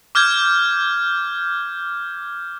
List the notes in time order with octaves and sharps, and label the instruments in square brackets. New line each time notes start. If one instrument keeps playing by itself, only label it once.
[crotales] D6 F6 G6 G#6